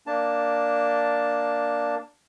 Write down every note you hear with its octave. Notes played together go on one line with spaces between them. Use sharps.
A#3 D4 A5